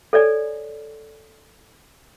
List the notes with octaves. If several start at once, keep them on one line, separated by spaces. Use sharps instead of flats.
A4 C#5 D5 G#5